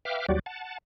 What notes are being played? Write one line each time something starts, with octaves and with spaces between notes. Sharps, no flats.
B4 E5 F5 G5 D6 F6
D#2 F#3 G3 F#4 G4 D5
F#5 A5